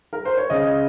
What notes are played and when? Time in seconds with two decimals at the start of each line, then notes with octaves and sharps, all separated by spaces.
0.13 A#4
0.25 C5
0.37 C#5
0.50 C#3 D#5